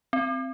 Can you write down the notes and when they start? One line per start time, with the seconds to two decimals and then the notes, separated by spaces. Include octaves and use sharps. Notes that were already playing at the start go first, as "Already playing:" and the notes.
0.13 C4